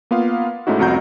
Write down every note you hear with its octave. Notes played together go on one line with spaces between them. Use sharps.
A#3 B3 F4 F5
G#2 A3 C#4 D#4 E4 F#4
C2 F2 F#4 A#5 G6